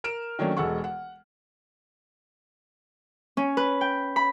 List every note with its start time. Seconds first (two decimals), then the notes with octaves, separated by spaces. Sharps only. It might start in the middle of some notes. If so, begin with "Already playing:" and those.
0.04 A#4 F6 D7 E7
0.39 D#3 F#3 A3 A#3 C#4 D4
0.57 E1 G#3 A4 F#5 C#6
0.84 F#5
3.37 C#4
3.57 B4
3.81 G5
4.16 B5